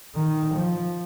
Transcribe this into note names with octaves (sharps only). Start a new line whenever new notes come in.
D#3
F3